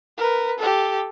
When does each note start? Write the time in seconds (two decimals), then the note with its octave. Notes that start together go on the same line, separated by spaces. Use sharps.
0.17 A#4 B4
0.59 G4 A4